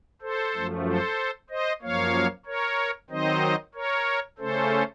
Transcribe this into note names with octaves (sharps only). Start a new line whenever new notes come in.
A4 C5
F#2 F3 A3
A4 C5
C5 D#5
F#2 F3 A#3 C#5 F5
A#4 C#5
D#3 F#3 C4 D#4 C5 D#5
A#4 C#5
C#3 A3 C#4 A4 C5